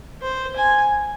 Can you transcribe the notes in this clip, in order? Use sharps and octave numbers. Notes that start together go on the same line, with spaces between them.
C5
G#5